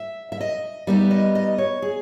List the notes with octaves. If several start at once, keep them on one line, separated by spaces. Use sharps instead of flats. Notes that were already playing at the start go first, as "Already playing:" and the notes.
Already playing: E5
E5
D#5
G3 B3 D#4 E5
D#5
D#5
C#5
G#4